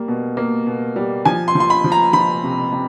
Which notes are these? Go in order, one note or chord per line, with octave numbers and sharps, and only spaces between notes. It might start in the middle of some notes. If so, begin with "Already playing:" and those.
Already playing: G3 A#3
B2
A#3
B2
G3
F3 G#5
C6
F3
C6
B5
F3
A#5
F3 B5
C3
C3